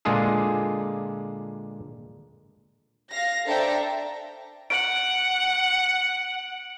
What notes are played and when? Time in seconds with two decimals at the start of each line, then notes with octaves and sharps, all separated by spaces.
0.05 A#2 D3 G#3 F4 G#4 A4
3.10 F5 A#6
3.47 D4 A4 C5 E5 G5 A#5
4.70 F#5 D7 F#7